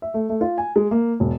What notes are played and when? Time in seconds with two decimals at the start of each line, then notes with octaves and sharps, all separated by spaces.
0.02 E5
0.14 A3
0.29 A3
0.41 F4
0.58 G#5
0.76 G#3
0.91 A#3
1.20 E1